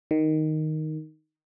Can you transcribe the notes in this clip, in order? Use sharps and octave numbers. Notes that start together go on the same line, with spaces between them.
D#3